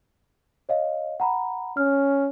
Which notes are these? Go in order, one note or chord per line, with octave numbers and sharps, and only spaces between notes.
C#5 D#5 F5
F#5 A#5 B5
C#4 F6